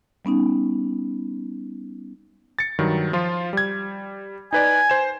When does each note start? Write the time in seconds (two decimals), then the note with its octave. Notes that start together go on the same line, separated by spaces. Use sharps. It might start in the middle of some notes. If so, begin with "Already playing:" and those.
0.25 G3 B3 C#4 D#4
2.59 A6 C#7
2.78 G2 D#3 F#3
3.13 F3 F4
3.53 G3 G#6
4.53 D#4 B4 D5 G#5
4.90 C5 E7